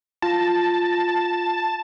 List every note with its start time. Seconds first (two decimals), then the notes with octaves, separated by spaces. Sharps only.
0.22 F4 A5 A#6